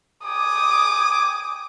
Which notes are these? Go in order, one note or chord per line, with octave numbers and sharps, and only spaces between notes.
G5 G#5 D6 D#6